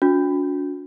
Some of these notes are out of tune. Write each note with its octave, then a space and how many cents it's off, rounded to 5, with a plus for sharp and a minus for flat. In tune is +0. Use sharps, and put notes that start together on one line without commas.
D4 -45 F#4 -35